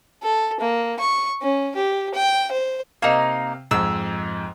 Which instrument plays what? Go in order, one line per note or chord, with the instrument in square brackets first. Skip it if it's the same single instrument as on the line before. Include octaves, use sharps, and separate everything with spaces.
[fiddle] A4
A#3
C#6
C#4
G4
G5
C5
[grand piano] C3 F5 [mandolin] A#3 D#4
[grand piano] F2 G#2 [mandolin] E6